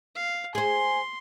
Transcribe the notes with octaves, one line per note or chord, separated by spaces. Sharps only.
F5
G#4 C5 G#5 C6